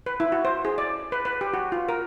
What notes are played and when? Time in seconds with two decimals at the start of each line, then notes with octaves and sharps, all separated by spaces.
0.06 B4
0.20 E4
0.32 F#4
0.45 C5
0.65 G#4
0.78 D5
1.12 B4
1.25 B4
1.41 G4
1.54 F#4
1.72 F4
1.89 A#4